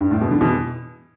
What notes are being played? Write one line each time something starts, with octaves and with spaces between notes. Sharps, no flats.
G2
A2
B2
D3
B2 E3